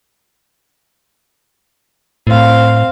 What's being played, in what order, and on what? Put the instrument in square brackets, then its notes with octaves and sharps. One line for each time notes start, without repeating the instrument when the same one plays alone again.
[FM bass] A2 [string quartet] C4 F5